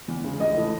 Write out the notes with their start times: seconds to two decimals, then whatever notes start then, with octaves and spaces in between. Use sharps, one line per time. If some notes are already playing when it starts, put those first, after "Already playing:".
0.08 E2
0.24 C#3 G#3
0.40 A1 D#5
0.57 A2 E3 A3